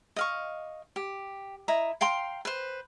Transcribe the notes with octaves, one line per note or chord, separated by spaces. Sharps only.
D#5 F5 C#6
G4
E4 D#5 A#5
F5 G5 A#5 C6
B4 C5